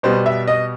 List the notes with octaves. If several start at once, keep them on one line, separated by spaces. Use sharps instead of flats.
B2 G3 B3 C5
E5
D#5